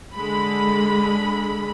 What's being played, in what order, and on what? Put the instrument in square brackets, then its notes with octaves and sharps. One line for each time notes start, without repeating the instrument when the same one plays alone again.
[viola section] D3 G#3 B5